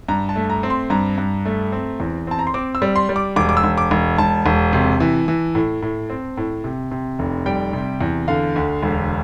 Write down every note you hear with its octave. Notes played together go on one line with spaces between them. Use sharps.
G2 A#5
A5
A3
A#5
C4
C6
G2 A#5
G2
A3
C4
E2
C4 A5
A#5
C6
C4 D6
E6
G3
C6
G3
D6
E1 D6
D6
E6
E1
D6
E1
E1 A5
E1
C3
E3
E3
A2
A2
C4
A2
C3
C3
F1
G3 G5
C3
E2
D3 F5
D2
E1